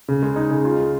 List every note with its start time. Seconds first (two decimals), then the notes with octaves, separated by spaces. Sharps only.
0.08 C#3
0.23 G#3
0.36 D#4
0.50 C#3
0.65 F4
0.79 G#3